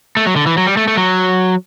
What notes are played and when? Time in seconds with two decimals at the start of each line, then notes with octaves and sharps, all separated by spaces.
0.17 A3
0.26 F#3
0.36 D3
0.47 E3
0.58 F#3
0.67 G3
0.77 A3
0.88 A3
0.97 F#3